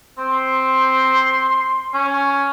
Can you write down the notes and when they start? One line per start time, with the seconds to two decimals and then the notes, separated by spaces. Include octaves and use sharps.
0.18 C4 C6
1.94 C#4